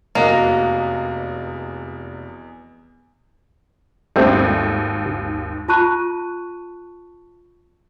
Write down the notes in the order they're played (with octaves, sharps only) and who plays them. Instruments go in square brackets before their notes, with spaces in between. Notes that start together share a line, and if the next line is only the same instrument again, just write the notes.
[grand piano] F1 F#4 [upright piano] E2 D#5 A#6 [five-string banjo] A#3
[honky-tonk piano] G#1 D#2 [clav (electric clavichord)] G3 A3 C4
[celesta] F4 A5 B5 C#6 F#6 D#7